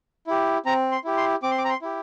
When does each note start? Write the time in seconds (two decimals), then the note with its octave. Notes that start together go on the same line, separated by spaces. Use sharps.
0.27 E4 G4
0.66 C4 A#5
0.92 C6
1.04 E4 G4
1.17 C6
1.43 C4 D6
1.51 C6
1.58 D6
1.65 A#5
1.69 C6
1.82 E4 G4